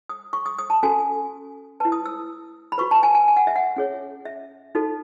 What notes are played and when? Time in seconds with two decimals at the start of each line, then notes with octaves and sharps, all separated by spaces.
0.09 D#6
0.33 C#6
0.46 D#6
0.58 D#6
0.70 A5
0.83 C#4 F#4 A4 G#5
1.80 E4 B4 A5
1.92 D#6
2.06 E6
2.72 B5
2.78 F#4 B4 C#6
2.91 A5
3.03 G#5
3.15 G#5
3.28 G#5
3.37 F#5
3.47 E5
3.56 F#5
3.76 C#4 G#4 C#5
4.25 E5
4.75 D#4 F#4 A4